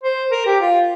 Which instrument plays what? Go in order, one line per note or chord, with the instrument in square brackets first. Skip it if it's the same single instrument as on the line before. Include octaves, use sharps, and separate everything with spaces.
[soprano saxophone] C5
A#4
G4
F4